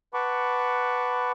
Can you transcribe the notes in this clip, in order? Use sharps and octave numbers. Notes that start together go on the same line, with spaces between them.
B4 F#5 A5 B5 C#6 D6